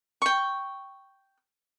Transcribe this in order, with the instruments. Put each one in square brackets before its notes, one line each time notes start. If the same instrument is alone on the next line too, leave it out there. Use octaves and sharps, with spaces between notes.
[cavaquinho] G5 C#6